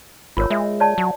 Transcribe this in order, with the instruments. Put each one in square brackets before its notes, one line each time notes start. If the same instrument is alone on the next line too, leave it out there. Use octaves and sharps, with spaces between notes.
[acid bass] G#1 [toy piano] F4 A#4 C#5
[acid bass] G#3 [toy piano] E5
[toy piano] C#5 D5 A5
[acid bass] F#3